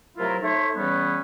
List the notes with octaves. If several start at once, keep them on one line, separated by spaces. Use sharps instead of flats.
C3 F#3 A3 E4 F4 A#4
A3 D#4 A4 C5 C#5 E5
C#3 E3 G3 B3 C#4